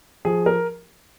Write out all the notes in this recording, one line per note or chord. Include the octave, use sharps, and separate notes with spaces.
F3 G#4
A#4